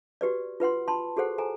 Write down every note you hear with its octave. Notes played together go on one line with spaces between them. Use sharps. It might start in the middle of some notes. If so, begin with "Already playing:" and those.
F#4 G4 B4 D5
F4 B4 F#5 C6
A5 B5 C6
F#4 G#4 A4 C5 F#5
A4 G#5 A#5